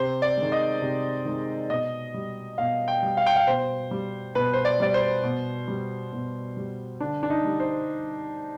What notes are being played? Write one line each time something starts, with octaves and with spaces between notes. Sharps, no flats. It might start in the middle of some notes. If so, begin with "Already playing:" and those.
Already playing: C3 C5
D5
D#3 G#3
D#5
C3
D#3 G#3
B2 D#5
G3
B2 F5
G5
G3
F5
G5
F5
B2 C5
G3
B2 B4
C5
D5
G3 D5
C5
B2
G3
B2
G3
D3 D4
D4
D#4
G3
C5